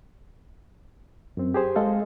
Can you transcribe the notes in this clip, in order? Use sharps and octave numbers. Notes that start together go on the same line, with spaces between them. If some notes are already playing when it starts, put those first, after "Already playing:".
F#2 C4
G4 G#4 C5
G#3 A4 D#5 F5